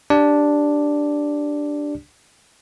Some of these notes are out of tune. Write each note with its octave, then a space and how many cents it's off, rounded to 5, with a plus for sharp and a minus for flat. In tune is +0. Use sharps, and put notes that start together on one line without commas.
D4 +0 G4 +0 D5 +0